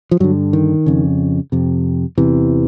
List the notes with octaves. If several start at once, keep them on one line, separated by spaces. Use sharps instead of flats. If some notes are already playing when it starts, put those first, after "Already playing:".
F3
G2 D3 F#3
D#3
F2 C#3
F2 C3
E2 C3 E3